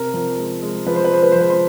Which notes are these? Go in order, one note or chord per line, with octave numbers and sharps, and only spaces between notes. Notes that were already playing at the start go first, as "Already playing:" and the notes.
Already playing: C3 A#4
F3
G#3
G#3
F3 B4
C5
B4
G#3 C5
B4
F3 C5
B4
C5